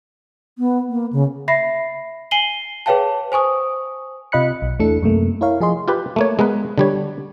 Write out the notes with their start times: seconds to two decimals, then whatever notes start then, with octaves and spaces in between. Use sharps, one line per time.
0.58 B3
0.89 A#3
1.13 C#3
1.48 E5 B5 A#6 C7
2.31 G#5 C7 D#7 F#7 G7
2.86 G#4 B4 C#5 F5 G5 A5
3.32 C5 G#5 C#6 D#6
4.32 C3 F4 D#5 B5 F#6 C#7
4.62 B1
4.79 E2 A3 D4 E4 A4 C#7
5.02 F#2 C3 A3 A#3
5.41 E4 A#4 C#5 F5
5.61 F3 G#4 D#5 C6
5.88 F4 G4 B4
6.16 A3 A#3 C#5
6.39 G#3 B3 A#4 B4
6.78 D3 G3 C#5